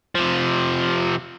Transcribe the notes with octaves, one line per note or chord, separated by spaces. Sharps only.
C3 F3